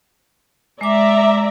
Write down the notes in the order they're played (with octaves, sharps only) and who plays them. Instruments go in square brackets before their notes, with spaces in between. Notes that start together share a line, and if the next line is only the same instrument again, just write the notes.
[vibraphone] G#3 D6 [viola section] D5 E5 A#5